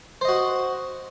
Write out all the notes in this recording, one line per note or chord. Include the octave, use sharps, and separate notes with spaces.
F#4 C5 D#5